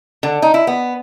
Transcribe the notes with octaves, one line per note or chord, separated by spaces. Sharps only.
D3
D#4
E4
B3